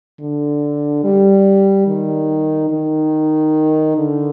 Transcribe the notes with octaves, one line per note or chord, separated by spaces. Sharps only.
D3
G3
D#3
D#3
D3